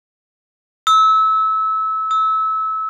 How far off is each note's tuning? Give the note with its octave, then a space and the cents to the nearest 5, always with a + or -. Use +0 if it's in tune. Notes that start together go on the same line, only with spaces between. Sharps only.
E6 -25
E6 -25